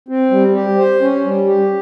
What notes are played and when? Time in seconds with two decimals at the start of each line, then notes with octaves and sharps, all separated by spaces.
0.08 C4
0.31 G3
0.54 G4
0.78 C5
1.01 C#4
1.24 G3
1.47 G4